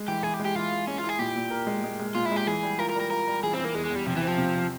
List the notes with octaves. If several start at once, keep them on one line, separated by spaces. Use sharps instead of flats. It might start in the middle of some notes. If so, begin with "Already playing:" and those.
Already playing: G#3
E3 G4
E3 G#4
G4
G#3
G4
E3 F4
G#3
G#3 C#4
F4
E4 G#4
A#2 G4
A#2
A#4
G#3
G#3
G#3
A#2 F4
E4
G#3
G4
E3 G#4
G3
F4 A#4
A#4
G3
A#4
F4 A#4
G3
E3 G#4
C4
E3 A#3
E2 G#3
E2 G#3
G3
C3 F3
E3
F3 C4
C3
C3